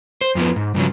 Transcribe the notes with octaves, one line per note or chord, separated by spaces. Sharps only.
C5
F2 F3 B3
G#2
G2 C#3 F3 F#3